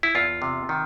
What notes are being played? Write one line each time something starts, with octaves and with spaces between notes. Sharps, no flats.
E4
E2 F4
C3
D#3